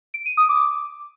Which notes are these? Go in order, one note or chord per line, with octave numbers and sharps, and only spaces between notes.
D7
D#7
D#6
D6